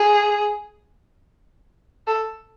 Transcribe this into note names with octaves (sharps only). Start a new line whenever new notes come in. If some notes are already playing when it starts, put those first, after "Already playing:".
Already playing: G#4
A4